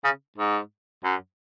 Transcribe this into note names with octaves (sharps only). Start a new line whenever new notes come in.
C#3
G#2
F#2